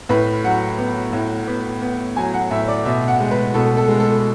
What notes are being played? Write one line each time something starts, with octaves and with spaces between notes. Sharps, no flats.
A2 B4
F#3 F#5
B3
A2
B3
B3
F#3 G#5
F#5
A2 E5
D5
B2 E5
F#5
G#3
B4
B2 A4
A4
G#3
A4